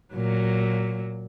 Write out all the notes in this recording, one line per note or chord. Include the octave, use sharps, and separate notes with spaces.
A#2 F#3